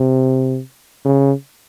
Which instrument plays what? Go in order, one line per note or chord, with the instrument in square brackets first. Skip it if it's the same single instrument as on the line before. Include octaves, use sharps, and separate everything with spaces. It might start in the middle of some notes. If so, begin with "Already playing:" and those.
Already playing: [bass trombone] C3
C#3